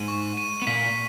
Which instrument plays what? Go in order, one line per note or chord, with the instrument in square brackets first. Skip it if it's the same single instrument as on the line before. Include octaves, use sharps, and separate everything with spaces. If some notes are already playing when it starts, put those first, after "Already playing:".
Already playing: [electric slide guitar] G#2 G#3 [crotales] D#7
[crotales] C#6
D#7
[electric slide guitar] B3
[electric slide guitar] A#2 A#3 [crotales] B6